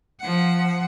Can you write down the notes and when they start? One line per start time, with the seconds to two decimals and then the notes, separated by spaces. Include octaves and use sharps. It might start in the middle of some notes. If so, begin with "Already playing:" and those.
0.20 F3 F#5